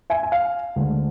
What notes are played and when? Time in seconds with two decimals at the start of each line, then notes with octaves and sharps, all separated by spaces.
0.10 E5 G#5
0.23 G#5
0.32 F5
0.76 D2 D3 G#3